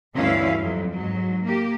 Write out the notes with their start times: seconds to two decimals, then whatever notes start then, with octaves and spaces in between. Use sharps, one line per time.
0.14 D2 G2 E3 C#4 E4 F5
0.61 F2 F#3
0.93 G#2 F#3
1.44 A#3 G4